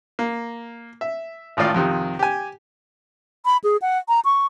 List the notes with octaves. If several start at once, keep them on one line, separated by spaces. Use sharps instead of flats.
A#3
E5
G#1 A2 D#3 F4 D5 F5
F2 C3 D#3
G4 G#5
B5
G#4
F#5
A#5
C#6